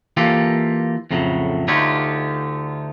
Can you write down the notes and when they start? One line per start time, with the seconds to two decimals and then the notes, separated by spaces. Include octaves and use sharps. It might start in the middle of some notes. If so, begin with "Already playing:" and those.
0.17 E3 A#3 F4 G4 A4
1.11 F2 A2 C#3 F#3
1.68 D2 D3 D#4 F4 G4 C#5